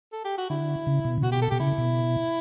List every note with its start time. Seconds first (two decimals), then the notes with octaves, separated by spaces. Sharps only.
0.12 A4
0.24 G4
0.38 F#4
0.50 D3 E4
0.87 C#3
1.05 B2
1.18 C#3
1.23 B2 F#4
1.32 G4
1.42 A4
1.50 B2 G4
1.60 C#3 E4
1.78 B2